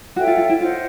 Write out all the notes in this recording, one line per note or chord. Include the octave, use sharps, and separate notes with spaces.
F#4 A4 C#5 E5 G5
F4
F4
E4
F4 C5 D#5 F#5